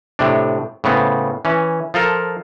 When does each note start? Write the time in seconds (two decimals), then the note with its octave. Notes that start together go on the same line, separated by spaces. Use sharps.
0.19 A2 C3 D4
0.84 A2 C#3 B3 C4
1.45 E3 C#4
1.94 F3 F4 A4 A#4